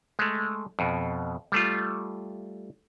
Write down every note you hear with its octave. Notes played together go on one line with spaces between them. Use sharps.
G#3 A3
F2 B2
G3 A3 F4